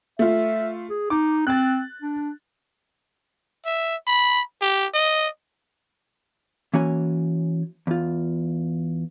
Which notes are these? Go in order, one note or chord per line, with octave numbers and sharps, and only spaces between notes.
A3 F4 E5
G#4
D#4 D6
C4 F#6 A6
D4
E5
B5
G4
D#5
E3 A#3 C#4 F#4 C#5 G#5
E2 F4